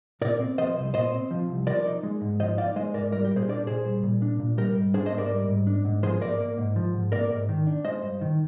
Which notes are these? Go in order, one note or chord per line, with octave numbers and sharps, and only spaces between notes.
A#2 A#4 D5
C4
F3 C5 D#5
C2
A#2 C5 D#5
C4
F3
C2
F3 A#4 D5
D#4
G#3
G#2
F3 C5 D#5
D#4 D5 F5
G#3 C5 D#5
G#2 A#4 D5
G3 A#4 D5
G4 A#4
A#2
G#4 C5
D4 A#4 D5
A#2 G#4 C5
G3
A#2
D4
A#2
G3 G4 A#4
G#2
D4 G#4 C5
C5 D#5
G#2
A#4 D5
G3
G#2
D4
G#2
F3 G#4 C5
G#2 A#4 D5
A#3
G#2
F3
G#2
A#3 A#4 D5
G#2
D#3
D4
G#3 C5 D#5
G2
D#3